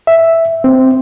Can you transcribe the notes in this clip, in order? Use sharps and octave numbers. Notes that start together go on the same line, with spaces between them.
E5
C4